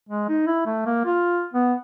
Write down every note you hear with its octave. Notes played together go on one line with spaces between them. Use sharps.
G#3
D#4
E4
A3
A#3
F4
B3